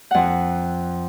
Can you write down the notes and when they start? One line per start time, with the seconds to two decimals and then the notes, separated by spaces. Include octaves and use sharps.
0.11 F2 F#5